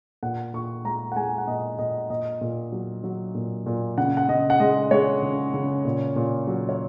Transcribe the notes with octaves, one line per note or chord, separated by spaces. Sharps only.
A#2 F#5
A#2 C#6
G#3 A#5
F#5
G#3 G#5
F#5
A#2 D#5
A#2 D#5
A#2 D#5
A#2
F#3
F#3
A#2
A#2
C#3 F#5
F#5
C#3 D#5
F#5
G#3 D#5
G#3 C#5
C#3
C#3
A#2
A#2
F#3
C#5